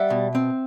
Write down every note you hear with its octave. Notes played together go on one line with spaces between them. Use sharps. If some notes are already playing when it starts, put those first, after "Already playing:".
Already playing: G3 E5 F#5
B2
C4